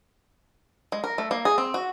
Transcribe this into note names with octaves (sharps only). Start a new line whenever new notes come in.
G#3
A#4
A3
A#3
G#4
C4
F#4